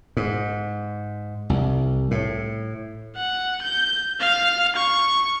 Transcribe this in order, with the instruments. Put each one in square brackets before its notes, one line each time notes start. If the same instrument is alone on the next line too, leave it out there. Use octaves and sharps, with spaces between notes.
[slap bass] G#2
C2
A2
[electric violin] F#5
G6
F5
C#6